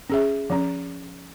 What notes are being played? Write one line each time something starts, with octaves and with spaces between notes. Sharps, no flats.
C#4 G#4 E5
F3 C#4